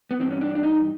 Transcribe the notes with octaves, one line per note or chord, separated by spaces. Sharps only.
B3
G2 E3 C4
C#4
D4
D4
D#4